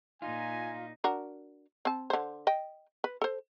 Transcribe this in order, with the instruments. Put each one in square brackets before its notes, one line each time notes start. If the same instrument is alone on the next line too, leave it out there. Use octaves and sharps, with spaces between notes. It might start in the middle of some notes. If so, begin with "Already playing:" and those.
[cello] A#2 D#4 [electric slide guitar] F4 [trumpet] G#5
[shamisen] D4 F#4 A#4
C4 A5
D3 C5
D#5 G5
B4
A4 C5